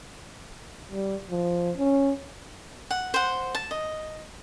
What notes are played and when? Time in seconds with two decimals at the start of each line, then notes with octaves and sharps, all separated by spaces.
0.91 G3
1.30 F3
1.77 C#4
2.91 F#5
3.14 C5 F#5
3.55 A5
3.71 D#5